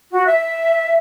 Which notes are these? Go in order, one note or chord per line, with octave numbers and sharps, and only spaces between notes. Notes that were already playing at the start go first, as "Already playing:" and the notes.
F#4
E5